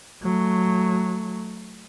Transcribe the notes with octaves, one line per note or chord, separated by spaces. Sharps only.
F#3 A3